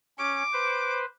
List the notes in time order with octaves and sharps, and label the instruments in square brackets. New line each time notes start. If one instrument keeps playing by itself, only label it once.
[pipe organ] C#4 [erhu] D6
[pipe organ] B4 C5